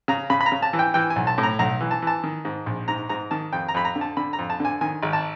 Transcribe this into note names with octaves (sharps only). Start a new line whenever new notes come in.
C#3 A#5
C#3 B5
B5
A#5
C#3
A5
E3
G5
E3 G5
G#5
B1
A5
A2
A#5
B1 A#5
E3
A5
E3 A5
D#3
G#2
A#1
G#2 A#5
G#2 A#5
D#3 A5
F2 G5
A#5
F2 B5
A#5
D3
A5
D3 B5
A#5
F2
A5
D3 G#5
D#3 G#5
G#1
A5